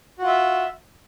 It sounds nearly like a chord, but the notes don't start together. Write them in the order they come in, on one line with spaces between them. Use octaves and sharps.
F#4 F4 E5